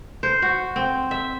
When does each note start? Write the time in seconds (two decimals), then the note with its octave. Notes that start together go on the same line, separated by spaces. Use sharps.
0.23 C5
0.42 F#4
0.76 C4
1.11 E5